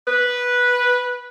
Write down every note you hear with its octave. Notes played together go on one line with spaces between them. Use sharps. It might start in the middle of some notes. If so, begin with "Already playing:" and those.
B4